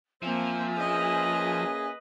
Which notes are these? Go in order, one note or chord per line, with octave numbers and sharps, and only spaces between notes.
F3 A#3 C4 E5 G#5 E6
A#3 C#4 G#4 B4 D#5